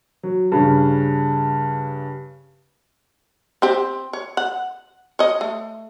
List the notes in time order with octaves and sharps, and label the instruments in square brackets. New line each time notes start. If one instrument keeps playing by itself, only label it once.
[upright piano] F#3
G2 C#3
[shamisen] C4 G4
C#5
F#5
C#5 D#5
A3